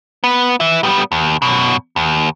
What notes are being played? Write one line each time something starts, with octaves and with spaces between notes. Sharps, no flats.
B3
E3 E4
G3 B3
D#2
F#2 B2
D#2